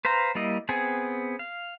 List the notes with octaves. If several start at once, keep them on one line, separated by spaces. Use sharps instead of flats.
B4 C5 F5 A#5
G3 A#3 E4 D#5
B3 C4 G#4 G#5
F5